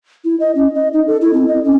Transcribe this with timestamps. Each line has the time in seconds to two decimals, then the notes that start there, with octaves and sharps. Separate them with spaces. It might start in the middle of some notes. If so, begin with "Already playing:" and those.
0.25 E4
0.40 D#5
0.55 C#4
0.75 D#5
0.93 D#4
1.07 A4
1.21 E4
1.34 C4
1.48 D#5
1.64 C#4